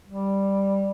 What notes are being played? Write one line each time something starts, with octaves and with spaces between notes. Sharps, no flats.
G3